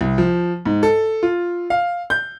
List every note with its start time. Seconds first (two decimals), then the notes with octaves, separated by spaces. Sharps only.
0.01 C2
0.18 F3
0.66 G#2
0.83 A4
1.23 F4
1.70 F5
2.10 G6